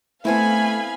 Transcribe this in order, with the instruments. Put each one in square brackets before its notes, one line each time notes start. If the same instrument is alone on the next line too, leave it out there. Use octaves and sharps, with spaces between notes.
[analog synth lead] A3 [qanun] B3 C4 E4 [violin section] F5 G#5 B5